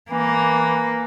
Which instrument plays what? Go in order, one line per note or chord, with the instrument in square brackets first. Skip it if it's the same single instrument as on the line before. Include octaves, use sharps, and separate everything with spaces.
[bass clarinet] E3 [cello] A#3